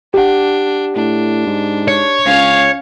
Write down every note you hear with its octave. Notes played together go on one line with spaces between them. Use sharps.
D4 G4 F#5
A2 D4
G#2
C#5
C#2 C#4 F5